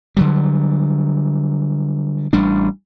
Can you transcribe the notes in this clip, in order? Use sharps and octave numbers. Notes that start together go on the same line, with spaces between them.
D3 F#3 G3
A1 G3 D4